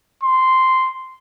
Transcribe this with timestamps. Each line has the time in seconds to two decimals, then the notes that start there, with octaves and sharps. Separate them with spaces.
0.23 C6